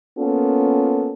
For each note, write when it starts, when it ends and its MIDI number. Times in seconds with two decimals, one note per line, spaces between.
0.19 1.13 58
0.19 1.13 59
0.19 1.13 61
0.19 1.13 65
0.19 1.13 69